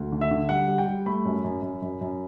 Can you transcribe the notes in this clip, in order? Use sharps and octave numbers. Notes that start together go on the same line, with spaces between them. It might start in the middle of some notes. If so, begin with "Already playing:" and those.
Already playing: D2
D3
E5
D3
G3 F#5
G3
G5
G3
A3 B5
F#2
F#2
F#2
F#2
F#2